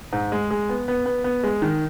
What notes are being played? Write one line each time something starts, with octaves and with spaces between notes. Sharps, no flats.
G#2
G#3
G#3
B3
B3
B3
B3
G#3
D#3